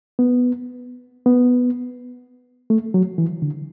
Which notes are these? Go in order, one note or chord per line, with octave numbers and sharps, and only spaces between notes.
B3
B3
A3
F#3
E3
D3